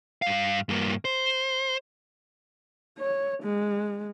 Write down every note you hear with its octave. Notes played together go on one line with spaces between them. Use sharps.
G2 F5
G2 A#3
C5
C#5
G#3